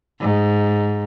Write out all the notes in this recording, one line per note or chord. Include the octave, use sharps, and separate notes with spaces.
G#2